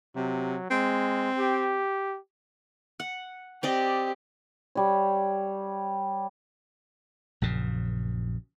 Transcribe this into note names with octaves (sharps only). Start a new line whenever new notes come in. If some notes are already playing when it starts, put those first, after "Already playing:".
C3 F#3
G#3 C4
G4
F#5
C4 G4 D5 D#5
G3 C#5
A#1 F#2 C#3